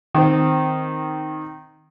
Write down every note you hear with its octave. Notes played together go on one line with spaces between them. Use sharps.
D#3 C4